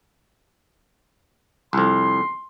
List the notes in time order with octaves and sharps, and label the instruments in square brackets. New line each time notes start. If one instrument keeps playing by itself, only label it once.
[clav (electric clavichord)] C2 F2 [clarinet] C6